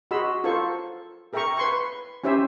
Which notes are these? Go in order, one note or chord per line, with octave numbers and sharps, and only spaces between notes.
F#4 G#4 D#5 B5 C6 E6
F4 A4 A#4 C5 C#6
G#4 A#4 E5 G5 A#5 C#6
B4 C6 C#6
C#4 E4 G4 C5 E5 G#5